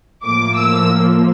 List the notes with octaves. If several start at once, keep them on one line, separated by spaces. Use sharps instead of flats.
A2 F3 A#3 D6
E6